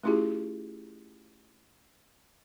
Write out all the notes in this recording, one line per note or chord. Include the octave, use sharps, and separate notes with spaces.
A3 C#4 E4 F4 G4 G#4